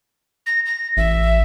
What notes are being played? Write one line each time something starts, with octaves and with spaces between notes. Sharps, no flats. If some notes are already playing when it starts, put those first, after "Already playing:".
A#6
A#6
A1 E5